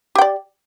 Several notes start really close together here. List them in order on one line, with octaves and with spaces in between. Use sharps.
G4 G5 D5